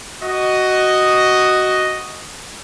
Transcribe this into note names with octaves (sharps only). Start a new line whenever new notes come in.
F#4 D#5